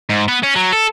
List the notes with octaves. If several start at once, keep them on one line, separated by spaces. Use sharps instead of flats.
G#2
B3
C#4
F#3
A4